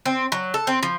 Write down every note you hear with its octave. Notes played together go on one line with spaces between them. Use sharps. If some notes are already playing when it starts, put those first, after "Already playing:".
C4
F#3
A4
C4
F3